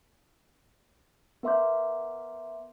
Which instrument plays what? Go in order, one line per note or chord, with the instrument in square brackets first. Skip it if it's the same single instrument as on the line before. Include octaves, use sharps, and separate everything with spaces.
[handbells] B3 A#4 E5 C6 D6 G6